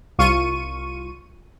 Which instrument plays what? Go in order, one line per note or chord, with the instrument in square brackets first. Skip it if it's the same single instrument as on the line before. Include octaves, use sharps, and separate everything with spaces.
[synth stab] C2 F4 C#6 D#7